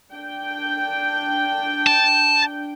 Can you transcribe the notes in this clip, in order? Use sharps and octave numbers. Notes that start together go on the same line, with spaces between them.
D4 G5
A5